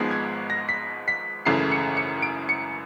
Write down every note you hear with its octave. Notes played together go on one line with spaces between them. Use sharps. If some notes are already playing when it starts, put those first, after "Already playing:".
Already playing: G#1 G#2 F3 G#3 B3
G#6
A#6
B6
B6
G#1 F#2 C#3 E3 A3 C7
C#7
C#7
D7
C#7